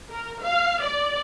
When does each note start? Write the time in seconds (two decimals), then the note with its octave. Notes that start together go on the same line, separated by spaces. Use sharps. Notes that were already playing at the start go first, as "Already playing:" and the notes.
0.12 A#4
0.43 F5
0.82 D5